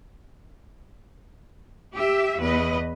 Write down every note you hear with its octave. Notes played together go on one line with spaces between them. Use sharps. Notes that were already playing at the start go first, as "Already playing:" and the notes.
G4 E5
E2 B4 D#5